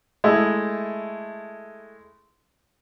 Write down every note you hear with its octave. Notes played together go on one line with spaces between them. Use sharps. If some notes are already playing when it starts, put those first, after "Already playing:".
G#3 A3 E4